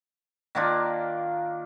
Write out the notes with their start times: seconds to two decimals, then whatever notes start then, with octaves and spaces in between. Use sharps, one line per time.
0.55 D#3 A#3 D4 F4